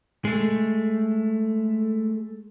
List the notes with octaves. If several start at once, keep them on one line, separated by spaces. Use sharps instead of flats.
G#3 A3